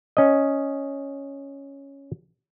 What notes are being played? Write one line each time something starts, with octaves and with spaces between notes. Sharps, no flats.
C#4 D#5